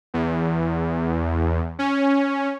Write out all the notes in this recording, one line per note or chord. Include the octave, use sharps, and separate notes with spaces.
E2
C#4